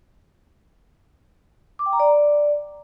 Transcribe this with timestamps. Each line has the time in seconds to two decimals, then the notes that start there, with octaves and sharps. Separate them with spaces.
1.79 D6
1.86 G5
1.93 A#5
2.00 D5